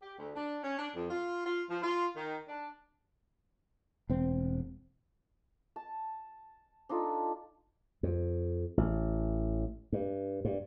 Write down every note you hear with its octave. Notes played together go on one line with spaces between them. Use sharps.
G4
D2
D4
C#4
D4
F2
F4
F4
F3
F4
D#3
D4
E1 C4
A5
D4 D#4 F4 A4
F2
A1
G2
G2